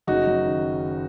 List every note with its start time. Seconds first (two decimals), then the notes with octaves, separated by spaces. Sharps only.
0.07 F#1 D#4 F#4
0.27 F#2
0.45 D#3